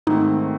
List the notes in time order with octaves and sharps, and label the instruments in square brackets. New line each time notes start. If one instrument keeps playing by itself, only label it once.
[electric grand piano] G#2 D#3 A3 C4 [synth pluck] D#4